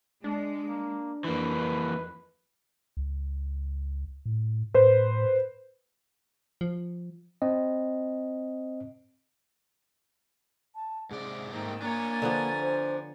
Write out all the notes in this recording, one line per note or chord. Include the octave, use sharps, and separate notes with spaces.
G#3 D4
A#3
F2 E3 A#3 B4
C#2
A2
A2 B4 C5
F3
C4 D#5
A5
G#2 C3 G#4 D5
G#2 D#3 A3 A#3 C4 G5
A#3 D4 C#5 G#5 A#5 A6
D3 F3 B3
C5